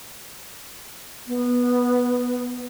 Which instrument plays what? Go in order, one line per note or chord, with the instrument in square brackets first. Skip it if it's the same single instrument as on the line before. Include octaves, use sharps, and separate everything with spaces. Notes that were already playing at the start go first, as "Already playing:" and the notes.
[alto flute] B3